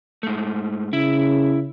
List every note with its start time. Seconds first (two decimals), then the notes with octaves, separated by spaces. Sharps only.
0.23 G#2 A3
0.93 C#3 E4